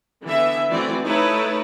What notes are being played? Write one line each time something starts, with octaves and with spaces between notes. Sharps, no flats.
D3 E3 B3 E5
E3 A3 C4 F#4 D5
A3 D#4 E4 A4 B4 C#5